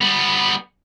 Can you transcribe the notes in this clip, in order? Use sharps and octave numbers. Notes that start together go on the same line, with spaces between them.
G3 B3